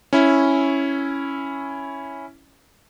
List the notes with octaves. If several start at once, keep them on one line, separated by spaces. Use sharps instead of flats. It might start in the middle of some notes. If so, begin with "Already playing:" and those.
C#4 E4